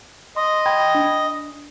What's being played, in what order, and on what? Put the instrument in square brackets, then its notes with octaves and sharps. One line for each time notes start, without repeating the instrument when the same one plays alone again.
[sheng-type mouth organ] D#5 [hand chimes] C6
[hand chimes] G5 B5 G#6
D4